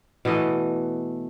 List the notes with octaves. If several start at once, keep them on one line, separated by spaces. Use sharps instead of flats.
B2 E3 A3 D#5